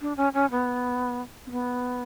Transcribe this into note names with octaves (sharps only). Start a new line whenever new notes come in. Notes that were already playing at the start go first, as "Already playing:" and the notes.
D4
C#4
C#4
B3
C4
B3